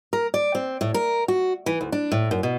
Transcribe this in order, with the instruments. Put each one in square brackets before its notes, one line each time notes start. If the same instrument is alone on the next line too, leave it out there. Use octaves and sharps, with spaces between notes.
[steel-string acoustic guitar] A#4
D5
C4
A2
A#4
F#4
E3
D2
D4
A2
F#2
B2